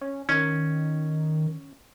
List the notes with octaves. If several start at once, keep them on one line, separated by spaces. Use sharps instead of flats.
C#4
D#3 C#4